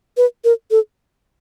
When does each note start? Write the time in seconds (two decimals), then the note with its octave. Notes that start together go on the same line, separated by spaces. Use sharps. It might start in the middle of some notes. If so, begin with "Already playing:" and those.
0.17 B4
0.44 A#4
0.71 A4